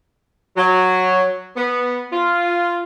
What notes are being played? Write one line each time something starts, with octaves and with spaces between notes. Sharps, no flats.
F#3
B3
F4